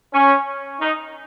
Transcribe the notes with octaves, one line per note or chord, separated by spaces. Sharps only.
C#4
D#4